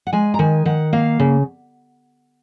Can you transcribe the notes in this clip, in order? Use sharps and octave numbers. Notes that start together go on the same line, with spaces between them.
F#5
G#3 G#5
A#5
D#3 G#5
D#3 F#5
A#3 F5
C#3